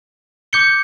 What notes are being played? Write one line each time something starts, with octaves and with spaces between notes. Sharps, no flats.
D6 G6 C#7 G7